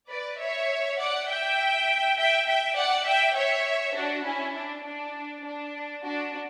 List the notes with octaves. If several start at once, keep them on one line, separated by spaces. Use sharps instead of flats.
B4 D5
C#5 E5
D5 F#5
E5 G5
E5 G5
E5 G5
D5 F#5
E5 G5
C#5 E5
D4 F#4
C#4 E4
D4
D4
D4
D4 F#4